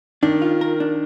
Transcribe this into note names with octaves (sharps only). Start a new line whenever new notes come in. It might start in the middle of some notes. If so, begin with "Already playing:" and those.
D#3 D4
F4
A#4
D4